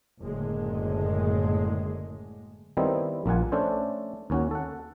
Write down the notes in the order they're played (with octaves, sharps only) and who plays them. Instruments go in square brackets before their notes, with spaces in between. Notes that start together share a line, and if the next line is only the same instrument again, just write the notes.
[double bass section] F#1 A2 D3 G#3
[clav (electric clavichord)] D#3 G3 B3 C4 D#4 E4
A#1 A#3 F4 F#5 G#5
A3 C#4 D4 A4 C5
D#2 C#4 F#4
A4 F#5